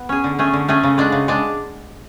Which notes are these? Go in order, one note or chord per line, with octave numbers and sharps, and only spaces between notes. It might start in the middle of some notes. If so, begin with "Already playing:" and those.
Already playing: B3
C#4 G#4
D3
A3 C#4 G#4
D3
A3 C#4 G#4
C#3
G#3 D4 F#4
C#3
G#3 D4